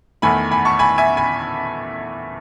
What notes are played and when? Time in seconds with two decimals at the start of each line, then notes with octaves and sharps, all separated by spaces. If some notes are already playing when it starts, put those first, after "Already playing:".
0.22 E2 D#3 A3 G#5 B5
0.51 G#5 B5
0.65 A5 C#6
0.79 G#5 B5
0.98 E5 G#5
1.17 G#5 B5